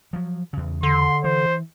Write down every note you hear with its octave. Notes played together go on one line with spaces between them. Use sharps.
F3 F#3
E2 C#3
D3 C6
E3 C5